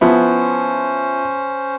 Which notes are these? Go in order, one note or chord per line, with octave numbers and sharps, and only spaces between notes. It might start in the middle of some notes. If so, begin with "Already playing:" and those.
F3 B3 C#4 E4 C5